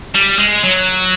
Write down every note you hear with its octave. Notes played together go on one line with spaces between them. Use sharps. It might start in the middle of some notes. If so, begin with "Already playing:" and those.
G3
G#3
F#3